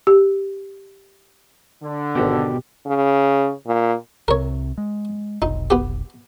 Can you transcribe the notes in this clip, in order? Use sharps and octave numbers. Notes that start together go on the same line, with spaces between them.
G4
D3
G#1 B2 F#4 G4 G5
C#3
A#2
C2 C3 A#4 C#5
G#3
F1 B1 D#4
B3 G4